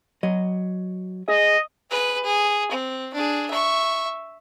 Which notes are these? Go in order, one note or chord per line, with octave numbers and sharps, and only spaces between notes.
F#3 D#5
G#4 D#5
G#4 B4
G#4
C4
D4 G#4
E5 C#6